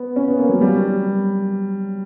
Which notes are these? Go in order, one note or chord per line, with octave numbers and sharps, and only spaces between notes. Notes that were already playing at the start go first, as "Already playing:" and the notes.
Already playing: B3
C#4
B3
A#3
F#3
G3